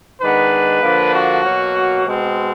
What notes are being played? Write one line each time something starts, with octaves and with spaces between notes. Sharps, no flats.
D#3 G#3 B3 D4 B4
D3 F3 A#3 D4
F#4
B2 F#3 A#3
B2 G#3 C4